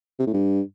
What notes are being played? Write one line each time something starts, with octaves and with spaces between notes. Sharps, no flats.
C3
A2
G2